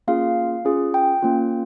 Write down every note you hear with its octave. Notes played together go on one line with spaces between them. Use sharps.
A#3 C#4 F4 G#4 F5
C#4 F4 G#4
G5
A#3 C#4 F4